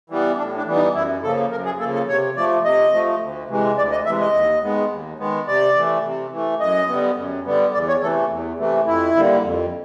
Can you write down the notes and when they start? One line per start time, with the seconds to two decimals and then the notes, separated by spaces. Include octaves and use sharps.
0.10 E3 G3 B3
0.38 A2 D4
0.57 D4
0.66 E3 G3 B3
0.76 D#4
0.95 F#2 E4
1.23 C#3 F3 A#3 A4
1.51 F#2 A#4
1.65 G#4
1.80 C#3 F3 A#3 A4
1.94 A4
2.08 C3 C#5
2.36 F3 A3 D5
2.64 C3 D#5
2.93 F3 A3
3.21 D2
3.49 C3 E3 G#3
3.78 D2 D5
3.91 D#5
4.06 C3 E3 G#3 E5
4.20 D#5
4.34 D#2
4.62 D#3 G#3 B3
4.91 D#2
5.19 D#3 G#3 B3
5.47 C3 D5
5.76 E3 A3
6.04 C3
6.32 E3 A3
6.60 F#2 D#5
6.89 D3 G3 B3
7.17 F#2
7.45 D3 G3 B3
7.73 E2 D5
7.88 C#5
8.02 C3 E3 A3 A4
8.30 E2
8.58 C3 E3 A3
8.87 F2 E4
9.15 D3 G3 A#3
9.44 F2